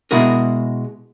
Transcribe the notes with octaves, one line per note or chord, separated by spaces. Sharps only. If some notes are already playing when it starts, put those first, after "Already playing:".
B2 G#3 E4 F#4 G#4 A#4